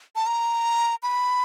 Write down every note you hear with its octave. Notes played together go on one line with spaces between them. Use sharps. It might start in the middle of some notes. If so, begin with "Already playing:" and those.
A5
A#5
B5